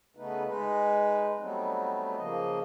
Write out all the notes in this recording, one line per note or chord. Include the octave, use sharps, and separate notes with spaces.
C#3 A3 B3 D#4 B4
G#3 D#4 B4
F#3 G3 A3 B3 C4 D#4
C#3 F3 A#3 D#5